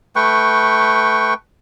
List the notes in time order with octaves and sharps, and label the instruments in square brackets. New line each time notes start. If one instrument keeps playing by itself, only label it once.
[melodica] A3 B4 G5 C#6